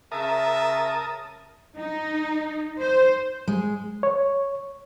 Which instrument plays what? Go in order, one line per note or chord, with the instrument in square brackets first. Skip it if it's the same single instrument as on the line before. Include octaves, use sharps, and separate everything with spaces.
[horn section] C#3 E5 [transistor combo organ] A#4 A5 D#6
[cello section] D#4
C5
[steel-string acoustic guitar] G#3
[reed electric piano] C#5